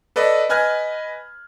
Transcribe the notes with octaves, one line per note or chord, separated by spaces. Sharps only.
A4 B4 D5 D#5
B4 D#5 G#5 F6 F#6 G#6